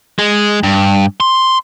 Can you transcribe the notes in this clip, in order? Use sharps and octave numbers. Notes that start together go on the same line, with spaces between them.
G#3
G2
C6